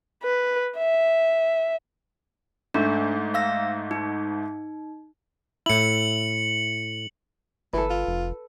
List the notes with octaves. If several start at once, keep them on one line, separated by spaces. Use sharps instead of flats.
B4
E5
G#2 A3 D4
F5 E6 A#6
D#4
A2 E4 C#7 F#7
G1 E3 A4 B4
F4
F1